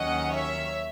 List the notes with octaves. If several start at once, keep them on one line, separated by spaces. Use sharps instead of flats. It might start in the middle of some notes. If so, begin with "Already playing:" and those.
Already playing: D#2 D#3 F#3 C#4 D#5 F#5
C#5 E5